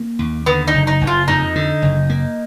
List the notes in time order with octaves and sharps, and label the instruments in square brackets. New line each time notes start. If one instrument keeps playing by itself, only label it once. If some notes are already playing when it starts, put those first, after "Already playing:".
Already playing: [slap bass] A#3
D#2
[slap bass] D3 [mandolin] B3
[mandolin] D#4
[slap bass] F#1
[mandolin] D#4
[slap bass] F#1
[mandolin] F4
[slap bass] F2 [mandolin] D#4
[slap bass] D3
F#1
A#3